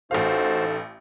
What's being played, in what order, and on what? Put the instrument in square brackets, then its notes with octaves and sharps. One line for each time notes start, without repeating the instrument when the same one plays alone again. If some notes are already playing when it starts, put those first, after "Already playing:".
[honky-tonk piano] A1 F5 [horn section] D#4 A4 [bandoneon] F#4 C5